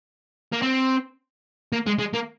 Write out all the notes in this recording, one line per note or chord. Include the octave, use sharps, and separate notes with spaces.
A#3
C4
A#3
G#3
G#3
A#3